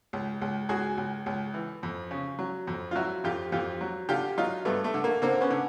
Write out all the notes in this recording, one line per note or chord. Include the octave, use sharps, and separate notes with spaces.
C#2
C#2
C#2 F#4 G#4
C#2
C#2
E3
F2
C#3
F#3
F2
F4
F#3 E4 F#4
F2 F4 G4
F2 F4 G4
F#3
D3 F4 G4
F#3 D#4 F4
G2 A3 B3
A3
D3
A#3
D3 A#3 C4
B3 C#4
D3